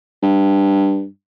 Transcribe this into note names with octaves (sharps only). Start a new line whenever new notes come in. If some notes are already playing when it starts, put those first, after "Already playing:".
G2